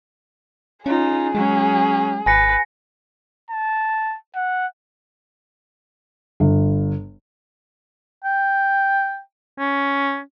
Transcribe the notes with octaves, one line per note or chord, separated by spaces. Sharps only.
C#4 D#4 F4 G#4
F#3 G#3 C#4
G#1 B4 G#5 A#6 C#7
A5
F#5
G1
G5
C#4